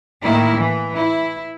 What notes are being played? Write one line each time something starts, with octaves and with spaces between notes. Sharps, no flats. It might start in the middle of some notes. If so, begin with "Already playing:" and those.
A2 D#3 A#3 E4
E3
E4